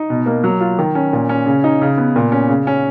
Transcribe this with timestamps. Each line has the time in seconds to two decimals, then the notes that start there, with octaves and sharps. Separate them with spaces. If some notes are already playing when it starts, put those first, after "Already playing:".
Already playing: D#4
0.10 B2
0.26 A#3
0.44 F#3
0.61 F4
0.79 D#3
0.95 C#4
1.13 A#2
1.29 C#4
1.46 C#3
1.64 D#4
1.82 C#3
1.98 B3
2.16 A#2
2.32 C#4
2.49 C#3
2.67 C#4